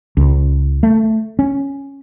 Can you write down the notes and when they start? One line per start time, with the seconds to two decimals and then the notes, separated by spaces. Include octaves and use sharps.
0.17 C#2
0.83 A3
1.39 C#4